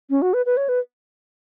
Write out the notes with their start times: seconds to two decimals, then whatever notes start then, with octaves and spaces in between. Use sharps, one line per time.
0.10 C#4
0.22 F#4
0.33 B4
0.46 B4
0.57 C#5
0.69 B4